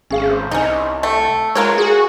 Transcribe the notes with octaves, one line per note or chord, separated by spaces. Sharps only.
G#1 C#4 G#4 F5
C5
C2 C#4 D#4
A3
G#3 F4 A#4 B4 C#5
F#4 G#4 G#5